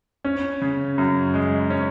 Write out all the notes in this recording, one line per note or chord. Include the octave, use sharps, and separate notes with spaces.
C#4
C#3
F#2
G#3
C#4